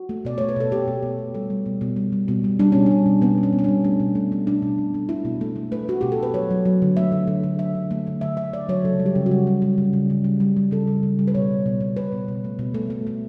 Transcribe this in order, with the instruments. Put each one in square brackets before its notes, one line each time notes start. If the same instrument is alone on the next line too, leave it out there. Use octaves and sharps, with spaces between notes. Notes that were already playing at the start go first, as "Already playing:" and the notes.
Already playing: [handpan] F#4
A3
B2 D5
A3 C#5
B4
B2 A4
A3 G4
B2
B2
A3
G3 A4
G3
B2
B2
G3
G3
B2
G3
G3 D4
B2 C#4
G3 D4
B2
B2 B3
B2
C#4
B2
C#4
G3 D4
A3 C#4
B2
A3
A3
B2 D4
B2
B2
A3
A3 E4
B2
A3
A3
A3 B4
A3 F#4
B2 G4
A4
A3 B4
F#3 C#5
F#3
F#3
D3
A3 E5
D3
D3
D3
F#3 E5
D3
A3
D3
D3 E5
D3 E5
D3 D5
F#3 C#5
C#3 A4
G3
G4
C#3
F#4
G3
G3
G3
C#3
C#3
C#3
G3
G3
G3
C#3 A4
G3
C#3
G3
B4
B2 C#5
B2
B2
B2
B2 B4
B2
B2
A3
B2
A3
A3
A3